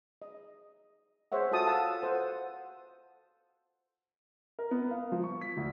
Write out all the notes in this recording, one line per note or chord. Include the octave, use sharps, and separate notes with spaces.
D#5
G#4 C5 C#5 E5 F#5
F4 F#4 A4 A5 D#6
F5 F#5 A5 E6
A4 C5 F#5
A#4
B3
F5
F3
C#6
B6
D2